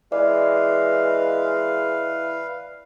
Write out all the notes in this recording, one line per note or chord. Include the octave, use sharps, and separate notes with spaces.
E3 G#3 B4 D5 F5